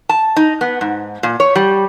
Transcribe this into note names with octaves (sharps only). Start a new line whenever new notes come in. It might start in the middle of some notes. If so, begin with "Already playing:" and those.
A5
D#4
B3
G#2
A#2
C#5
G3